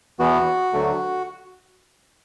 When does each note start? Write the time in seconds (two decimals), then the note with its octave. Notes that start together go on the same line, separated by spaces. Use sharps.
0.19 E2 E3 B3 F#4
0.73 D2 D3 F#3 A3